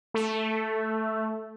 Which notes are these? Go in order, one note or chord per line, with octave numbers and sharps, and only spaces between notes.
A3